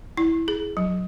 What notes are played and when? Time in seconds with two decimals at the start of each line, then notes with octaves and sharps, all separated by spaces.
0.17 E4
0.48 G#4
0.77 F#3